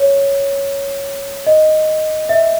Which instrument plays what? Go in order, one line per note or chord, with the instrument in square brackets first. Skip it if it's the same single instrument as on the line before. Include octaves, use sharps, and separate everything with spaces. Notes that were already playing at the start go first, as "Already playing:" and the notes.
Already playing: [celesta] C#5
D#5
E5